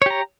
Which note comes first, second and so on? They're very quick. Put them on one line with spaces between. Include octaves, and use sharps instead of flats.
C#5 G4 A#5